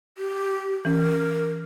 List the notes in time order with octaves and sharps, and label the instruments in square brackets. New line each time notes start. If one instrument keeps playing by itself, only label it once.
[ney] G4
[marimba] E3 C#4 [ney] A#4